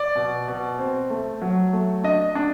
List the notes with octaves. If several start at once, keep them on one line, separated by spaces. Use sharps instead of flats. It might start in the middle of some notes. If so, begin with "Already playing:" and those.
Already playing: D5
B2
B2
C4
A3
F#3
A3
D4 D#5
D4